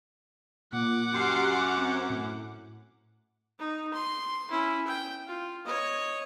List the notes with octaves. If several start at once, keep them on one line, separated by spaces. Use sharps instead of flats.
A#2 F#5 D6
F#2 G4 C6 C7
C4
A2
D#4
C6
C#4 E4
G5
F4
C#5 D#5